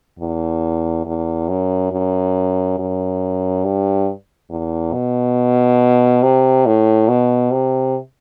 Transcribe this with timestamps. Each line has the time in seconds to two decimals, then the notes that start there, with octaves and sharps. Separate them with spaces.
0.19 E2
1.06 E2
1.49 F#2
1.92 F#2
2.78 F#2
3.64 G2
4.50 E2
4.93 B2
6.23 C3
6.66 A2
7.09 B2
7.52 C3